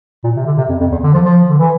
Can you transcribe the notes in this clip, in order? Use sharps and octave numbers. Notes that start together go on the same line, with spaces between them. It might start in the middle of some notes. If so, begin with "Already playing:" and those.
A#2
C3
D3
C3
F2
F2
E2
D3
F3
F3
D3
E3